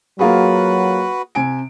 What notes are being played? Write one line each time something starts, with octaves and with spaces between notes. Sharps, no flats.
F#3 A#3 F4 F#4 G#4 B4
C3 G#5 D7